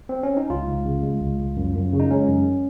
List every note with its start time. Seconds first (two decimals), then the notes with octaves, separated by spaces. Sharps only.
0.09 C4
0.23 C#4
0.37 D#4
0.50 C#2 F4
0.68 C#2
0.85 C#3
1.03 G#3
1.21 C#2
1.40 C#2
1.57 F#2
1.75 F#2
1.93 C#3
2.00 D#4
2.11 G#3 C#4
2.29 F#2